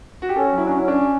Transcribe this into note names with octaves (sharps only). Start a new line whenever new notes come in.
F#4
G4
C#4 A4
F#4
F#3
E4
C#4 D4
E4
C#4
D4